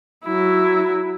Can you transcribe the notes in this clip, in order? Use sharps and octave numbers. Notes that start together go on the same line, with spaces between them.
F#3 E4